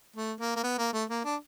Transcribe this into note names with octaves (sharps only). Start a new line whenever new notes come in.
A3
A#3
A#3
B3
A#3
A3
A#3
D4